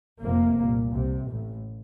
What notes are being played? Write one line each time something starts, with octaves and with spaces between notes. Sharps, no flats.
F1 F2 C3 A#3
C2 A#2
C2 C3
A1 A2